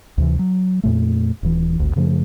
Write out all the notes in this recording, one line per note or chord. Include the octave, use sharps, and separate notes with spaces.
D2 C3 E3
F#3
F2 A#2 A3
D#1 E3
G#1 D2
F#2 C#3 F3 A3